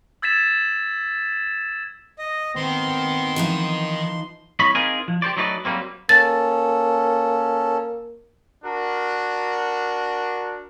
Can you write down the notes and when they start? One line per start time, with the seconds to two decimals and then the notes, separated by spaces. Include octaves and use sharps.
0.22 E6 G#6 A6 B6 E7
2.19 D#5
2.56 D#3 B3 C4 C6
3.36 E3 F3 D#4
4.59 C2 C#5 D#5 B5
4.75 C4 D#4 F4 G#4 A#4 G#5
5.08 F3
5.22 G4 A4 C5 D5
5.37 F#3 A3 D#4 E4 B4 D5
5.65 F#3 G3 A3 A#3 C4
6.09 A#3 C#4 A4 A6
8.65 D4 F#4 A#4